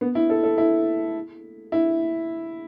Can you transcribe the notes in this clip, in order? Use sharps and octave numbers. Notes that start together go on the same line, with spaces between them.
B3
E4
A4
A4
E4
E4